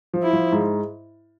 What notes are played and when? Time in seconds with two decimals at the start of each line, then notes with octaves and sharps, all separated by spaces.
0.14 F3
0.23 E4
0.33 F3
0.52 G#2